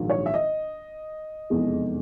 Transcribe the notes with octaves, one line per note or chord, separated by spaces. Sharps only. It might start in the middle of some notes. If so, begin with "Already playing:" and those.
Already playing: A#1 G#2 D#3 F#3
C#5
E5
D#5
F1 E2 B2 G#3